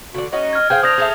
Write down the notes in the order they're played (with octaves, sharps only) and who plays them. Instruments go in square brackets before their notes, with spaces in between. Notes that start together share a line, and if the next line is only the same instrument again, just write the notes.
[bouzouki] D3 D5 [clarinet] F#4
[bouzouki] C#4 D#4 F#4 [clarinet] D#5
[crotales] F6 G#6
[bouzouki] G#4 C5 F5 [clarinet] G5 [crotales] G#6
[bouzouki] D4 [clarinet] C5 [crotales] D#6 A#6 F7
[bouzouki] G#4 A4 E5